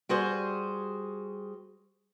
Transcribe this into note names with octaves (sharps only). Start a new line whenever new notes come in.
G3 F#4 G#4 C5